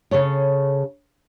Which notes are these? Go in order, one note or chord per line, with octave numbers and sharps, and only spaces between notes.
C#3 G#4 A4 C#5